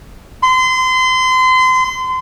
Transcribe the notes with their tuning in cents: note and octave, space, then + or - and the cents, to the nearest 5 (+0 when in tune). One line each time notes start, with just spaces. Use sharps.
C6 -30